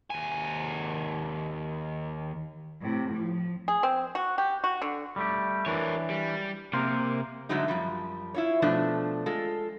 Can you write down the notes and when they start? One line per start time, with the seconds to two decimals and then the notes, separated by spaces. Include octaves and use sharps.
0.10 D#2 G#5
2.82 A2 C3
3.11 F3
3.68 G#4
3.83 C4
4.15 F#4
4.38 G4
4.64 F#4
4.82 D3
5.16 G3 A3 G4
5.66 E3 D4 A#4 C#5
6.10 G3
6.73 C3 A#3 A#4 C5
7.49 G#2 D3 F#3 G#3 A3 D#4
7.68 F#2 F3 G3
8.34 E4 F4 C#5
8.62 B2 F3 A3 D4
9.26 G#3 F4 A4